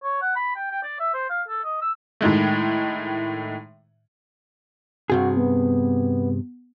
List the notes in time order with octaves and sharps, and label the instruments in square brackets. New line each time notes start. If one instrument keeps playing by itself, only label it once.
[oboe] C#5
F#5
B5
G5
G5
D5
E5
C5
F5
A4
D#5
E6
[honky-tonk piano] A2 D#3 G#3 A3
[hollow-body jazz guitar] G2 C3 G#4 [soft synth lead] F#4
[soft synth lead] B3